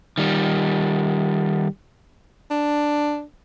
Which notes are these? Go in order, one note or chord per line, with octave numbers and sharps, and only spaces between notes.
D#3 G3
D4